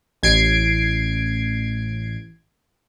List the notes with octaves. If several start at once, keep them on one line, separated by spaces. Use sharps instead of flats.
A1 G#6 C7 D7